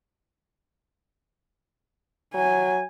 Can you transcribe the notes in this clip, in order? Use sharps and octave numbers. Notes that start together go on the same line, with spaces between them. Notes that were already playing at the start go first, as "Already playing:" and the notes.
F#3 G#5